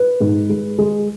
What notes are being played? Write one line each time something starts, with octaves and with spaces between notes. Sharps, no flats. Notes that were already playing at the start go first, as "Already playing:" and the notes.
Already playing: B4
G#2
G#3
G#3